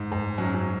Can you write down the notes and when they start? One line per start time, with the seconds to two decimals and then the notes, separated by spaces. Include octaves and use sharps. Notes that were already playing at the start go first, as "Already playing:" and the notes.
Already playing: G#2
0.12 G#2
0.38 F#2
0.54 F#2